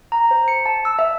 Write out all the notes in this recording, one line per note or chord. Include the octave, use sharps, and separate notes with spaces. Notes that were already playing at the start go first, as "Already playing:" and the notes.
A#5
C5
C#7
A5
E6
E5